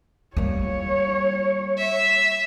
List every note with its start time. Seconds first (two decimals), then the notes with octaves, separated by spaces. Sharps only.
0.37 G3 A#3 C#5
1.78 E5